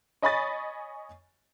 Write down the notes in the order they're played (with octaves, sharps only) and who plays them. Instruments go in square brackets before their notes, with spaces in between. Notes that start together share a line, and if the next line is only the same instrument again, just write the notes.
[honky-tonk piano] C#5 D#5 G#5 B5 C#6 A6